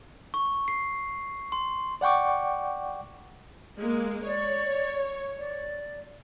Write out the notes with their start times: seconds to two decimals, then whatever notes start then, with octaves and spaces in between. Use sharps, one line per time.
0.34 C#6
0.68 C7
1.52 C6
2.01 D5 F#5 G5 C#6 D6
3.79 G#3 A#3
4.27 C#5 D5
5.38 D5